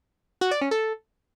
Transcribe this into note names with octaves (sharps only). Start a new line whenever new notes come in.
F#4
D5
C#4
A4